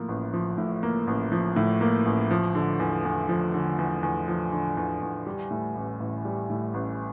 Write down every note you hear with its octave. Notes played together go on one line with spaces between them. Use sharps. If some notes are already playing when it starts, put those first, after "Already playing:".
Already playing: A2 F3 A#3
A1
F3
A2
A#3
A1
F3
A2
A#3
A1
F3
D3
E2
E2
F3
D3
E2
E2
F3
D3
E2
E2
G3
A2
A1
A1
G3
A2
A1